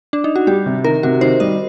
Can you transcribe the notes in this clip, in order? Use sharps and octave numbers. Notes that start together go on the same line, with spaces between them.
D4
D#4
F#4
G3 G4
C3
D#3 A#4
C3 F#4
D#3 C5
G3 D#5